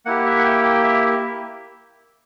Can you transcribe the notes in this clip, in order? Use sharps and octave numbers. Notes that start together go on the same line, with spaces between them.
A#3 E4 G4 F#5
E5
F#5
G5
G5
E5